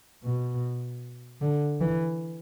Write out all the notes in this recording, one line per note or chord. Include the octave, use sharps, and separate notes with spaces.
B2
D3
E3